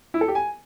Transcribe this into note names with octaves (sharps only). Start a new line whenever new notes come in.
E4
A4
G4
G#5